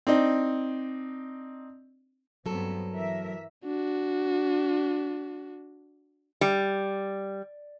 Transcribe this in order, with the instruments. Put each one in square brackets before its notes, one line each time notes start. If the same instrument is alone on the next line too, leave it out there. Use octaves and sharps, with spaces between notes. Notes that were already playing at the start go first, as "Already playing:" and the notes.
[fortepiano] C4 D4 D#4
[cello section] G2 B3 C4 [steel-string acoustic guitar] F#3 A4
[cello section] E3 A#4 E5
[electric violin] D4 F#4
[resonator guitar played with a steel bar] G3